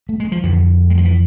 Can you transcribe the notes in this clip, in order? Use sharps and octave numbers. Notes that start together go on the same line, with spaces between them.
A3
G#3
F3
F2 D3 E3
G#3
F3
E3